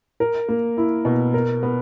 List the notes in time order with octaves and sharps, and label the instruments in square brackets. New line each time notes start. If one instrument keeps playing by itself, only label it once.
[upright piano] A#4
A#3
E4
B2
A#4
B3